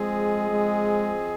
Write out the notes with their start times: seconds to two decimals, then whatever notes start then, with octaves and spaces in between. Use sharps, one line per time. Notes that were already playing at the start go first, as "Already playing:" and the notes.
Already playing: F3 G#3 C4 G#4 D#5
0.51 G#3